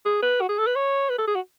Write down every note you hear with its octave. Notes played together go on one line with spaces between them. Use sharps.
G#4
B4
F#4
G#4
A4
B4
C#5
B4
A4
G#4
F#4